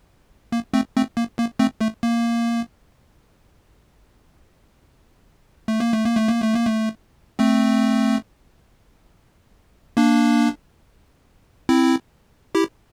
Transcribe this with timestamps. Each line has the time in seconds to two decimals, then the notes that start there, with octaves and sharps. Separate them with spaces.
0.52 A#3
0.74 A3 C4
0.96 A3 C4
1.17 A#3
1.39 A#3
1.59 A3 C4
1.81 A3
2.03 A#3
5.68 A3
5.80 A#3
5.92 A3
6.05 A#3
6.17 A3
6.29 A#3
6.42 A3
6.54 A#3
6.67 A3
7.39 A3 C4
9.97 A#3 D4
11.69 C4 E4
12.55 E4 G4